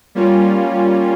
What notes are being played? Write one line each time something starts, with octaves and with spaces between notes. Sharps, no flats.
G3 A#3 C#4 F4